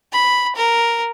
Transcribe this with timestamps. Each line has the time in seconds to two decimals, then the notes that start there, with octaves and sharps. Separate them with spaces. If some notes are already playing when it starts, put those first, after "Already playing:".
0.12 B5
0.56 A#4